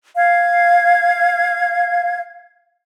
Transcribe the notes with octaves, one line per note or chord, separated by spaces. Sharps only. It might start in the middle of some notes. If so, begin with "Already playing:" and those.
F5 G#6